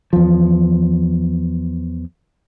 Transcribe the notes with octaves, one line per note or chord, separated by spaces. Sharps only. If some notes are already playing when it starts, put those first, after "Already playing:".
E2 F3